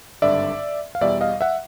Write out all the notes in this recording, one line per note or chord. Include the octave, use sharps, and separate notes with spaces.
G#1 G2 D3 D5 E5
F5
E2 B2 G3 D5 E5
D#5 F5
E5 F#5